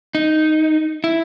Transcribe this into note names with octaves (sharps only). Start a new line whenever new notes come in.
D#4
E4